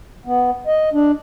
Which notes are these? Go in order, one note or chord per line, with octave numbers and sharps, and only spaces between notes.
B3
D#5
D4